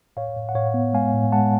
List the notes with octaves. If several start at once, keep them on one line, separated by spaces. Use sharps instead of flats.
A2 C#5 F5
A2
F#5
A2 C#5 F5
B3
G#3 F5 G#5
A2
G#3 F#5 A5